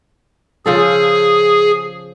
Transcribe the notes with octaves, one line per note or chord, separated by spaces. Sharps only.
C#3 F3 G#4 A4